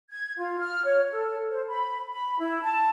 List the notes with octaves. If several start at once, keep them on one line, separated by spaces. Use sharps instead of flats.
G#6
F4
F6
C#5
A4
C5
B5
B5
E4
A5